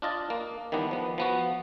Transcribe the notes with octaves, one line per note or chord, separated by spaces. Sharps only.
D4 F4 D#5 A5
A#3
D#3 E3 G3 B3 D4
F3 B3
F3 B3 F#4